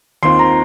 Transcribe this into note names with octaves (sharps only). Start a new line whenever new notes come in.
D#2 D#3 C4 F4 C6
A#5